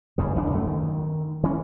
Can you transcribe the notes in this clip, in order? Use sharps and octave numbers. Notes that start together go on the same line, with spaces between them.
F#1 E2 C#3
G#1 D#3 D4
B1 F#2 A3
D#3
E3 C#4